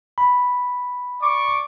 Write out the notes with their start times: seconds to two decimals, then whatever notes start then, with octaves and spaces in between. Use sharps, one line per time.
0.18 B5
1.22 D5 C#6 D6